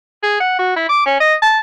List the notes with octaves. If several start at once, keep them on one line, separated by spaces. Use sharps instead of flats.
G#4
F#5
F#4
E4
D6
C#4
D#5
A5